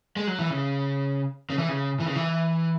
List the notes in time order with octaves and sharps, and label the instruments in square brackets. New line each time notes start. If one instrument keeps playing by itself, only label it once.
[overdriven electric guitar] G#3
F#3
E3
C#3
C#3
E3
C#3
E3
C#3
E3